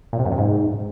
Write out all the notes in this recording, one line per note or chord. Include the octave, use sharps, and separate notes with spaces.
A#2
C3
F#2
C3
G#2